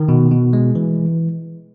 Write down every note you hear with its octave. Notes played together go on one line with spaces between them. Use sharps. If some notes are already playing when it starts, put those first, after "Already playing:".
Already playing: D#3
B2
B2
G#3
E3